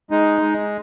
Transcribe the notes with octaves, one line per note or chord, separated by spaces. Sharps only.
G#3 D#4
G#3